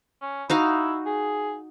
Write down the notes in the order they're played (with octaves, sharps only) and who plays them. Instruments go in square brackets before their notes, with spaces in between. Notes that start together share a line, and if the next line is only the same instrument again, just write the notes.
[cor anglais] C#4
[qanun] D#4 F#4 F5 [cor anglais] E4
[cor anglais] G#4